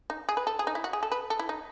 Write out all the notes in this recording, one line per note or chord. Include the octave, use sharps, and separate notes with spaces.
D#4
G#4
B4
A4
G#4
D#4
E4
F#4
G#4
A4
B4
A4
E4
D#4